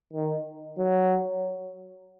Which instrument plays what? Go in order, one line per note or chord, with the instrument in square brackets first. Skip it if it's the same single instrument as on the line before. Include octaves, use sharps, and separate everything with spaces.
[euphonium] D#3
F#3